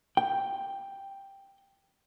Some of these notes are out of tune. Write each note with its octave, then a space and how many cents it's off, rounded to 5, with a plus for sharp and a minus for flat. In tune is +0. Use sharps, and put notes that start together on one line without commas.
G5 +5